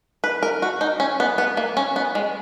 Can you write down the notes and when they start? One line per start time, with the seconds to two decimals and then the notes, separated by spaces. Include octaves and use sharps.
0.24 B4
0.43 A#4
0.62 F#4
0.81 D#4
1.00 C#4
1.20 B3
1.38 B3
1.57 A#3
1.77 C#4
1.96 B3
2.15 G#3